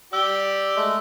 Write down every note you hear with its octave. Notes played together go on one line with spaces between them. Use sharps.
G4 D5 E6 G7
G#3 A3